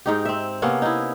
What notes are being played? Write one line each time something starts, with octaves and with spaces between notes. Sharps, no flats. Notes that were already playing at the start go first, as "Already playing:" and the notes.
G#2 D#4 G4
C4 E5
C3 A#3 B3 C#4
D#4 E4